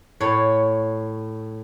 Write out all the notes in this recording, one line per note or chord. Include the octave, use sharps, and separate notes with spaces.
A2 C#5